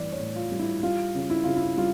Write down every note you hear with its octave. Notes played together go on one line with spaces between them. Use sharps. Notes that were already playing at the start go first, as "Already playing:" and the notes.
Already playing: A2 E3 G3 D5
C#5
A2
F4
G3
E4
G3 F4
C#3
E4
C#3 F4
E4
G3 F4